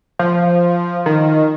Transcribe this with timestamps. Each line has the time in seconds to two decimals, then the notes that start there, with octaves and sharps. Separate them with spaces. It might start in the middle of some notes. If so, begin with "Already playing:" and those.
0.19 F3
1.06 D#3